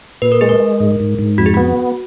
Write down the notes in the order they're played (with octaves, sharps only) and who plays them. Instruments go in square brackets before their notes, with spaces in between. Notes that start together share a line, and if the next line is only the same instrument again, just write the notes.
[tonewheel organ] A#2 [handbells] B4
[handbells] A#4
[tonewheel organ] G#3 [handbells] G#4
[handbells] A#4
[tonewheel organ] G#3
G#2
G#2
G#2
[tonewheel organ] F2 [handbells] F#4
[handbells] G#4
[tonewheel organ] B3 [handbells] F#4